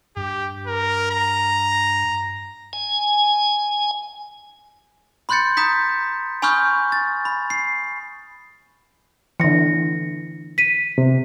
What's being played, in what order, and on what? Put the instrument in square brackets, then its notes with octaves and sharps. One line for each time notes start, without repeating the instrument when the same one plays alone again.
[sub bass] G2 [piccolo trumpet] G4
[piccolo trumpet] A#4
A#5
[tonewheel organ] G#5
[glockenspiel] B5 C6 F#6 G6 A6 C#7
A#5 D#6 G6 B6
G#5 B5 C#6 D#6 F6 G6
A6
B5
C7
[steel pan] D3 E3 [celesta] A#6 C#7
[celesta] B6 D#7
[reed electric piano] C3